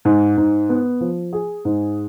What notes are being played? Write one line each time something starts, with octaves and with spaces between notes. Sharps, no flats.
G#2
G#2
B3
F3
G#4
G#2